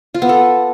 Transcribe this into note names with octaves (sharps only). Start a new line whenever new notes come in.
F4
B3
A4